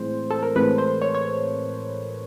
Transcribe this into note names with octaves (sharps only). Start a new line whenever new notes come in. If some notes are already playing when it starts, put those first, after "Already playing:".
Already playing: A2 E3 G#3 C4 C5
A4
A#4
A2 E3 G#3 C4 B4
C5
C#5
C#5